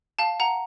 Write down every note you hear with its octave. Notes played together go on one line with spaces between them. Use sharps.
F5 A5
F#5 A#5